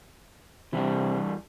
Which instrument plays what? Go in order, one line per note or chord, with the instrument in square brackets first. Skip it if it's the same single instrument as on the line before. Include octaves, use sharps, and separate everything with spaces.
[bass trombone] C3 [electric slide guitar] E3 G3 D4